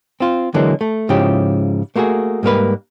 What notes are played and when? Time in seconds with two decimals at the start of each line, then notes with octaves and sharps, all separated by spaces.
0.20 C4 F4
0.54 D3 E3 F#3 G#3 A#3
0.81 A3
1.09 G#2 C#3 F3 E4 G4
1.96 A3 A#3 E4 F#4 G#4
2.43 G#2 G3 A#3 B4